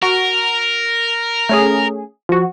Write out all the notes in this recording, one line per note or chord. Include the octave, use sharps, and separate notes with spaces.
F#4 A#4
A3 C#4 G#4
F3 F#4